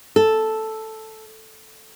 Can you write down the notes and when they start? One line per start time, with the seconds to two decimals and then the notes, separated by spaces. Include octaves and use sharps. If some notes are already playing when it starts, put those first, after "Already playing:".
0.16 A4